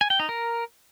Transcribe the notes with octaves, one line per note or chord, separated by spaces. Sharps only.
G#5
G5
D#4
A#4